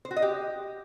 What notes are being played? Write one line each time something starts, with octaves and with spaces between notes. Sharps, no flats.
C5
F#4
D#5
G4